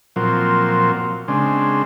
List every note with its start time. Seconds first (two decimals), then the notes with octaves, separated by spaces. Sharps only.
0.16 A#2 F3 F#3 C4
1.28 C#3 G#3 C4 D4